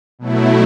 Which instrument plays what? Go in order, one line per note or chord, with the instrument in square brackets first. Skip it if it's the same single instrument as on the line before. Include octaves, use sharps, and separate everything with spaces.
[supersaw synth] B2 F#3 A3 E4